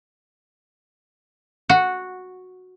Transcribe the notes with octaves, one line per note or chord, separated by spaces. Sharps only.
F#4